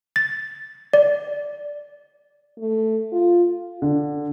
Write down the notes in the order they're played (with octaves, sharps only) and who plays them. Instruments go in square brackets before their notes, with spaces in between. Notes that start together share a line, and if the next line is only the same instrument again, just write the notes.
[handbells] A6
D5
[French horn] A3
F4
[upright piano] D3